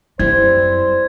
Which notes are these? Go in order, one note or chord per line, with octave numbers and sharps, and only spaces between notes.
F#2 G3 C4 E4 C5 G#6